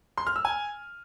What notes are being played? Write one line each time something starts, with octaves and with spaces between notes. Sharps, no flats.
C6
F6
E6
G#5